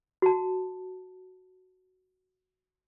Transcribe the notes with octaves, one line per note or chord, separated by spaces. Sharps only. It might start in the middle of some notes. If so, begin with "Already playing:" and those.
F#4 A5